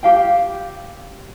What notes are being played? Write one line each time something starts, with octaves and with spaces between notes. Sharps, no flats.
G4 F5 G5